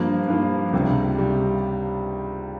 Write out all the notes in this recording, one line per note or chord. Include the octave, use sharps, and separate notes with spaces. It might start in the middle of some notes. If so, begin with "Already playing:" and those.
Already playing: G2 F3 A#3
G2 F3 A#3
C#2 C3 G3
C3 G3